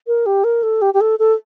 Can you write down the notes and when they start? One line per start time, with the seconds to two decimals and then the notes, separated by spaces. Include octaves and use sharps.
0.07 A#4
0.26 G4
0.44 A#4
0.63 A4
0.82 G4
0.94 G4
1.01 A4
1.19 A4